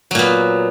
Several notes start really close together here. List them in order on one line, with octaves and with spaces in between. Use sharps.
F#3 A#2 B3